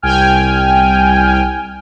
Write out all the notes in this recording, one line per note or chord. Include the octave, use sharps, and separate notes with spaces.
C2 G5 G#5 F6